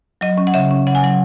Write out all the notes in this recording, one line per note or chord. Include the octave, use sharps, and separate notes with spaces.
F#3 D#5
C#4
F#5
C#3 E5
C#4
C#3 F#5
G#5
F#3 F#5